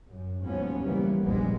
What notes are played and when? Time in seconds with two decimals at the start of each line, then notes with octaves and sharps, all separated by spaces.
0.11 F#2
0.45 D#2 G#2 F3 F#3 B3 C#4
0.83 C#3 E3 F3 G3 A#3 B3
1.22 F1 A#1 G2 G3 G#3 B3